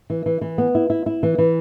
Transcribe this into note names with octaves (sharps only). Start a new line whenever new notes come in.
E3
E3
E3
B3
E4
E4
E4
E3
E3